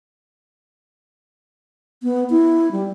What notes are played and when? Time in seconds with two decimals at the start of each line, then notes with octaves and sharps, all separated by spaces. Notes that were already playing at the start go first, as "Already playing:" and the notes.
2.03 B3
2.30 E4
2.72 G3